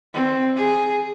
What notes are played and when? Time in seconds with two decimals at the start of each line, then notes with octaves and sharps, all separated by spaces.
0.14 C4
0.56 G#4